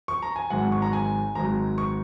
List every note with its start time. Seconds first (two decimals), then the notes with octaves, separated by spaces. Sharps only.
0.08 C#6
0.22 A#5
0.36 G#5
0.50 G#1 G#2 F#3 F#5
0.72 C#6
0.82 A#5
0.93 G#5
1.35 G#1 G#2 F#3 A#5
1.78 C#6